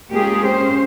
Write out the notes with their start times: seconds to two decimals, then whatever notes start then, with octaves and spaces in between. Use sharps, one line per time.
0.11 G#3 A#3 C#4 F4 G4 G#4
0.42 C#4 C5